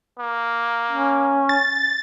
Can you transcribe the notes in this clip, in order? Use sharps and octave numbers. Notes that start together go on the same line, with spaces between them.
A#3
C#4
A6